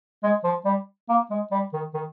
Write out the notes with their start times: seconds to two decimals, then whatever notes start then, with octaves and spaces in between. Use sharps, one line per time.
0.23 G#3
0.44 F3
0.65 G3
1.09 A#3
1.30 G#3
1.51 G3
1.73 D#3
1.94 D#3